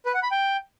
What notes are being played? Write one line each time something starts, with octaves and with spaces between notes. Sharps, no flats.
B4
F#5
B5
G5